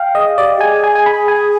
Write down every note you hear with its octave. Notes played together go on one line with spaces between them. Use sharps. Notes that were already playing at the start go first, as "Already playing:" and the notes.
Already playing: F5 G5
G#4 D#5
G4 D5
G#4 G#5
G#5
G#5
B5
G#5